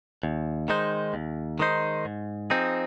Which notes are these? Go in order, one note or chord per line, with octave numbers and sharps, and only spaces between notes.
D#2
D#3 G#3 D#4 C5
D#2
D#3 G#3 D#4 C5
G#2
F3 C4 D#4 G#4